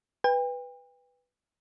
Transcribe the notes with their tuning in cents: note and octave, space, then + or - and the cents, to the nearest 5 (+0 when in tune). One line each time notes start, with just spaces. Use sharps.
B4 +0 G5 +40